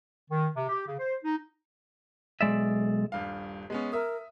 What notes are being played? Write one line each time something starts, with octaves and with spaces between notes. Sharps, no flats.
D#3
C3
G4
C#3
C5
D#4
B1 A2 G#3 D5 E5
D#1 G2 F5
G#3 B3 C#4
A#4 E5 D#6